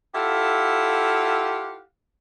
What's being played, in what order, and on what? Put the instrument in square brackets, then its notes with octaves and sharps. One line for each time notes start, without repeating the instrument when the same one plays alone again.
[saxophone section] E4 F4 G4 A4 F5 F#5